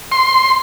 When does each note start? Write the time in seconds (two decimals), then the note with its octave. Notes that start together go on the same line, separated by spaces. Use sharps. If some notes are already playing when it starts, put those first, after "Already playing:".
0.12 C6